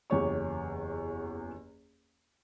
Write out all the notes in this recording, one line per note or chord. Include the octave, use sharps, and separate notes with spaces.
F#1 E2 G4 C#5 C#6